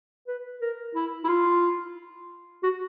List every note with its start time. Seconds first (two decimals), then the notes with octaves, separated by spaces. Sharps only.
0.27 B4
0.61 A#4
0.95 E4
1.24 E4
1.28 F4
2.63 F#4